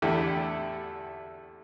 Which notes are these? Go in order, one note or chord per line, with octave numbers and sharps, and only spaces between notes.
E2 D3 A3 E4 G4